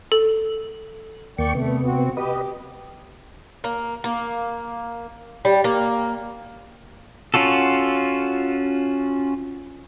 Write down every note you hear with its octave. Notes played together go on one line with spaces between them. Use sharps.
A4
D#2 A#3 D5 G5 C#6
C3 A3 B3
C4 F#4
G4 B4 D#5
A#3
A#3
G3
A#3
C#4 F4 F#4 A4